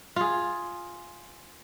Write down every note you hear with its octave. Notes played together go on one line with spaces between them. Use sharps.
F4 G#4